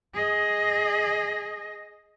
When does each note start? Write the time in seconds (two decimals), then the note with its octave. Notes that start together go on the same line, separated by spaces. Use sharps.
0.14 G#4 D#5